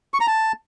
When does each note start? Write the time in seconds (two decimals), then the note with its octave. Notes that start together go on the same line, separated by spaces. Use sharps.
0.14 C#6
0.21 A#5
0.27 A5